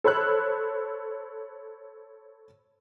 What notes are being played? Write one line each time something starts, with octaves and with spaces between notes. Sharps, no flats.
A4 C5 C#5 B5 E6 F#6